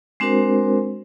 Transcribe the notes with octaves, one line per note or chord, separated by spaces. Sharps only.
G#3 C4 D4 F#4 A#4 C5